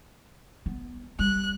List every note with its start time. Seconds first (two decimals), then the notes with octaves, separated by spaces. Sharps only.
0.66 B3
1.19 G3 F#6